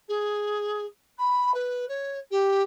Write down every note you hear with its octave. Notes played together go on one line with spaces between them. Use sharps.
G#4
B5
B4
C#5
G4